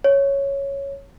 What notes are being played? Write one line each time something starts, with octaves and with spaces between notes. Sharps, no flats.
C#5